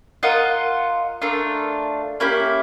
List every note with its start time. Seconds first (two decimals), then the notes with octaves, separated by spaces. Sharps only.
0.23 F4 A#4 D#5 F#5
1.22 A3 D4 F4 A#4
2.20 A#3 C#4 E4 G4